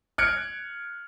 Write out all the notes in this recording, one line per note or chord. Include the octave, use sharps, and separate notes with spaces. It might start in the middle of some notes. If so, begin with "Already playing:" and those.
F6 F#6 G#6 C#7 D7